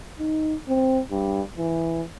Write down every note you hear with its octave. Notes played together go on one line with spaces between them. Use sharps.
D#4
C4
G2
E3